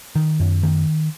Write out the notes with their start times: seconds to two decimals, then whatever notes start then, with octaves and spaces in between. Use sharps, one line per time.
0.15 D#3
0.40 F#2
0.63 D#3